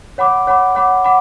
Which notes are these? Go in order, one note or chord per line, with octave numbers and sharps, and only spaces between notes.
C#5 F#5 B5 D6
C#5 F#5 B5 D6
C#5 F#5 B5 D6
F#5 B5 D6